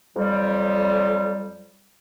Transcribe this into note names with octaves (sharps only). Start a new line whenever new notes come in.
F2 F#3 G3